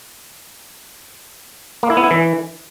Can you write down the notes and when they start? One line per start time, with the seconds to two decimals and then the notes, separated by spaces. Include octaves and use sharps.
1.83 A#3
1.90 E4
1.97 B3
2.04 E4
2.11 E3